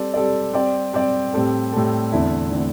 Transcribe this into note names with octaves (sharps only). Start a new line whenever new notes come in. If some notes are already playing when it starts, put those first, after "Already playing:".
Already playing: G3 C4 A4 D5
G3 C4 A4 D5
G3 C4 G4 D5
G3 C4 G4 D5
A2 G3 C4 A4
A2 G3 C4 A4
E2 D3 A3 C4 E4
D3 A3 C4 E4